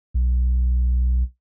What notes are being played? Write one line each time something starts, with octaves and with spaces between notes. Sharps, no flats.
B1